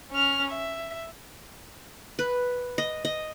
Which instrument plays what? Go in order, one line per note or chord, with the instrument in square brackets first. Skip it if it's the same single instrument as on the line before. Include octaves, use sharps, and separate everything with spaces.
[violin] C#4 F6
E5
[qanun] B4
D#5
D#5